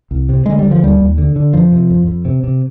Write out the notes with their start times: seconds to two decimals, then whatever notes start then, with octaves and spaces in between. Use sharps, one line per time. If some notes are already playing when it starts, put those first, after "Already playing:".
0.11 C2
0.29 C3
0.46 D3 G#3
0.59 G3
0.64 D3
0.71 F3
0.83 D#2 G3
1.00 D#2
1.18 D3
1.36 D3
1.53 F2 F3
1.72 C3
1.90 F2
2.08 F2
2.25 C3
2.44 C3